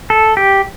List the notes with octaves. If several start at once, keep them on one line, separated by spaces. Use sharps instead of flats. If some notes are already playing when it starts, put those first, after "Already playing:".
A4
G4